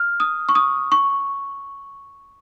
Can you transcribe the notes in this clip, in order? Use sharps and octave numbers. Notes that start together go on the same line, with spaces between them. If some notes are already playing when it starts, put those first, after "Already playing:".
Already playing: F6
D#6
C#6
D#6
C#6